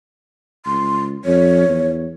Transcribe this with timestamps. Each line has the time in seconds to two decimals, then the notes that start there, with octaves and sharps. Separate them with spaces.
0.66 C#2 C6
1.25 F2 C#5
1.69 E2